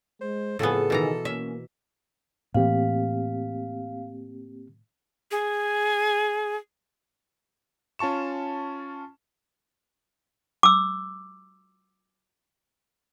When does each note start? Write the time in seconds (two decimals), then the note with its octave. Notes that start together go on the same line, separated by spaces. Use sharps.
0.21 G#3 C5
0.59 F2 A2 C#3 B3 F4 G#4 A4
0.90 B2 D#3 E3 A#5
1.25 A#3 C#4 E5
2.55 A2 E3 A#3 C4 G4 F5
5.31 G#4
7.99 C#4 F4 A5 C#6 E7
10.63 D6 E6